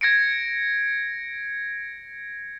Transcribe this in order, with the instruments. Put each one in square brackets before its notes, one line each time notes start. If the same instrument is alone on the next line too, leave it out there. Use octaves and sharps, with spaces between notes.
[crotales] G#6 A#6 C#7 D7